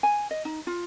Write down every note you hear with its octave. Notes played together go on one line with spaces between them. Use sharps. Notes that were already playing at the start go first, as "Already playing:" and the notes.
G#5
D#5
D#4
F4